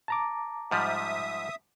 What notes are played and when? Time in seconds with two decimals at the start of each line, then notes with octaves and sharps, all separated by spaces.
0.08 A5 A#5 D6
0.71 G#2 F3 G3 E5 D#6